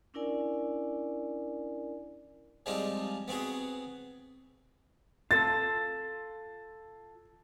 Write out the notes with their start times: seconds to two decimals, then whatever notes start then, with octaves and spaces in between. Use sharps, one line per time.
0.14 C#4 D4 E4 A#4 D5 G#5
2.66 F3 G3 G#3 C4 D#4
3.28 B3 C4 F#4 G#4
5.31 F4 A4 A6